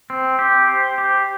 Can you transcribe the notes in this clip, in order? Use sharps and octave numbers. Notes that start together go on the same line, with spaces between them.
C4
G4
C5
G4